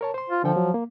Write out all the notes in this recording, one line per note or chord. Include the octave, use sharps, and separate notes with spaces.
A#4 C#5 A5
C5 C6
F4
D3 F3 A4 G5
F#3
A#3